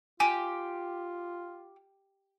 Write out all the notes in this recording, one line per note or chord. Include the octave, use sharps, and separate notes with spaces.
F4 G4 G#5